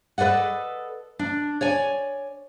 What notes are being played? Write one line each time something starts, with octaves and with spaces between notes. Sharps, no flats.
A4 B4 D5 D#5 F#5
D4
C#5 D5 G#5